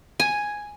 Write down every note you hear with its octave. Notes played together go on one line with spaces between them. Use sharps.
G#5